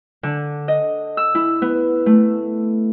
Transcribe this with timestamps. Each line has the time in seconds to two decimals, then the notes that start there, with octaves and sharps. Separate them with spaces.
0.23 D3
0.68 D#5
1.17 E6
1.35 E4
1.62 B3
2.06 A3